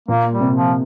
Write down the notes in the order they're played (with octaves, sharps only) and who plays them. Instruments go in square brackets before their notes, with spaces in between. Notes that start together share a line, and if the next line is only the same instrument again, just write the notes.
[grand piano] A#2 [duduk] A#3
[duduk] G3
[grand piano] C3
[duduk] F3